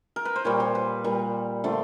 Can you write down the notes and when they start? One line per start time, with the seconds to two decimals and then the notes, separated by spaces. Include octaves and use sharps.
0.16 A#4
0.25 B4
0.36 C5
0.45 A#2 G3 C#5
0.60 C5
0.75 B4
1.04 A#2 G3
1.64 D3 F3 A3